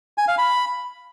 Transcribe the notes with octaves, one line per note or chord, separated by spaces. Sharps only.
G#5
F5
B5